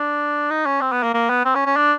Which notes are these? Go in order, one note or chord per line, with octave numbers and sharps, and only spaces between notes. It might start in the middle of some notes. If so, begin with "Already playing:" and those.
Already playing: D4
D#4
C#4
C4
B3
A#3
A#3
B3
C4
C#4
C#4
D4